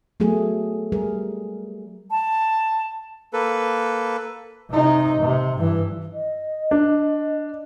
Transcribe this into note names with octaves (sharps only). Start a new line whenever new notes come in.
F#3 A3 B3 G#4
G3 G#4 A#4
A5
A#3 A4 B4
C3 D#4
C3
G2 E3
D#5
D4